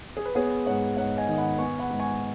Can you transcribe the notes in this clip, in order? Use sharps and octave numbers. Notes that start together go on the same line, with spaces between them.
G#4
B4
B3 G#4 C#5
G#2 C#5 F#5
G#2 C#5 F#5
D#5 G#5
D#3
F#5 B5
B3 G#5 C#6
F#5 B5
G#2
G#5 C#6